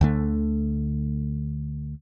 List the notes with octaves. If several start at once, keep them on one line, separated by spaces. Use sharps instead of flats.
D2 D3 A3